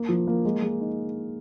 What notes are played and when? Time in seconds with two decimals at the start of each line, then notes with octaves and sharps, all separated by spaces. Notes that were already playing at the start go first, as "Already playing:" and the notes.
Already playing: A#3
0.09 F3
0.27 A#3
0.45 G#3
0.62 G#3
0.80 D#4